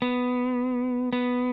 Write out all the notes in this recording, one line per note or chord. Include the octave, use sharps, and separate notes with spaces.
B3
B3